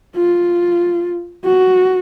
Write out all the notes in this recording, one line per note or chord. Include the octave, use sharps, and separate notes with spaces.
F4
F#4